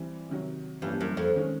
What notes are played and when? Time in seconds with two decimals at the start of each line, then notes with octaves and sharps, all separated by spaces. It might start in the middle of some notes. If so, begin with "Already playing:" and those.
Already playing: E3 G3 C4
0.29 C3 D#3 F#3
0.82 G2 E3 G3 A#3 C#4
1.01 F#2
1.17 F2
1.36 D#3 G#3 C#4